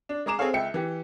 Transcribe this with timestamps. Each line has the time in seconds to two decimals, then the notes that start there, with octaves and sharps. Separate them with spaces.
0.09 D4
0.26 G#3 G#4 A#5 D6 E7
0.38 C4 G#4 A4 C#5 F5 G#5
0.53 C#2 E5 G5 C#7
0.74 E3 G4